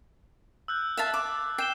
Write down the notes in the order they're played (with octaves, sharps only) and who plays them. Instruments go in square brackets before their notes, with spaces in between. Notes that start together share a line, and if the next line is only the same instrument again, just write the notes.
[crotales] E6 F#6 G6
[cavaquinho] E5 F5 A5
D6
[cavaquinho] G5 [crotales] C7 E7 G7